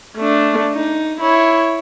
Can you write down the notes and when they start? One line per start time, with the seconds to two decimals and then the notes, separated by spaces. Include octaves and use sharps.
0.17 A3 D4
0.73 D#4
1.20 E4 C#5